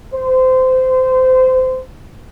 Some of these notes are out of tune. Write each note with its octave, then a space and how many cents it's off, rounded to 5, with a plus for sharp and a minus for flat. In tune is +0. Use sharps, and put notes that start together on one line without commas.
C5 -25